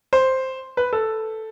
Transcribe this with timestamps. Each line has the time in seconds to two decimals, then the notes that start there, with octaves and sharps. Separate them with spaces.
0.13 C5
0.77 B4
0.93 A4